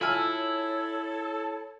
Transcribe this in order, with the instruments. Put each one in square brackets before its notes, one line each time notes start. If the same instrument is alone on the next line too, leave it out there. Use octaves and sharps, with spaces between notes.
[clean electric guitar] E4 [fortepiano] F4 G#5 F6 [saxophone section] A4 [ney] C#5